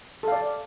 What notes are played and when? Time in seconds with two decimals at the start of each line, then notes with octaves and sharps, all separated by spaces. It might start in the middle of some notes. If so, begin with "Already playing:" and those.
0.23 A4
0.28 F5
0.32 D5